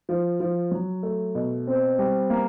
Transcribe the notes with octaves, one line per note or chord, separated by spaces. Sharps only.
F3
F3
F#3
A3
B2
C4
G3
A#3